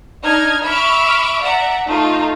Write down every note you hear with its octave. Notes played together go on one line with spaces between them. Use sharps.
D4 D#4 F6 G#6
E5 B5 C#6 D6 E6 F6
D5 E5 F#5 A#5
A3 D#4 F4